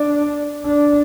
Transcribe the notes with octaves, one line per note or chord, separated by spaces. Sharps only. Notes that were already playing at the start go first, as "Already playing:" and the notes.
Already playing: D4
D4